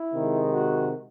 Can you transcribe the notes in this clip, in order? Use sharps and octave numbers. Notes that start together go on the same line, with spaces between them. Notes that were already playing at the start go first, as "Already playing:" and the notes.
Already playing: E4
C3 D#3 G#3
F#4